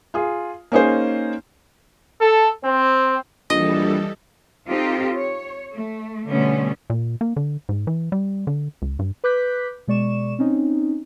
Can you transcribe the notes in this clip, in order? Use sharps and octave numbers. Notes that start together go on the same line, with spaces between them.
F4 G#4
A#3 C#4 D#4 G#4 C5
A4
C4
A#1 E3 G3 A4 D#5
C4 D#4 F4 G4 A4
C#5
A3
B2 D3 G3 A3 B3 C#4
A#2
A#3
D3
G#2
E3
G3
D3
C#2
G2
B4 D6 F#6 G6 B6
B2 G#3 D5 C#6 E7
C4 C#4 D#4